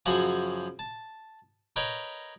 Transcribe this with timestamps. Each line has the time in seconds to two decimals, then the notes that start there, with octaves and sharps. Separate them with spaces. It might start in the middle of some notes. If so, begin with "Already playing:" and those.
0.06 F#2 C#3 F3 F#4 C#6 D#6
0.79 A5
1.76 A#4 B4 C#5 D#5 G5